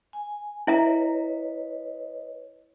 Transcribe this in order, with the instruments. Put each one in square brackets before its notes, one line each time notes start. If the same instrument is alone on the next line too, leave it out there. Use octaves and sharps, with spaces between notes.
[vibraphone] G#5
[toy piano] E4 E5 A#5 [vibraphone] B4 C#5 D#5